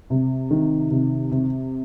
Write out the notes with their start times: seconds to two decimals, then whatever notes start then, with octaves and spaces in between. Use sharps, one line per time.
0.10 C3
0.51 D#3
0.91 C3
1.31 C3